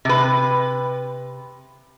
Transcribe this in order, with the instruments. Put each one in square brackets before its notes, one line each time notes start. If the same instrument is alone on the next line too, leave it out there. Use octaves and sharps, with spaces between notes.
[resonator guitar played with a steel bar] C3 B4